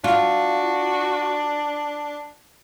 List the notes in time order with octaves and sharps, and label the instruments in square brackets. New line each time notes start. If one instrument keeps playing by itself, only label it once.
[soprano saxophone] D4 [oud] F4 [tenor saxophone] F#4